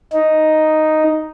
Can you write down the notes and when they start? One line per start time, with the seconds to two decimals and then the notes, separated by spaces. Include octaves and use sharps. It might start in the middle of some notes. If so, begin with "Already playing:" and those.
0.13 D#4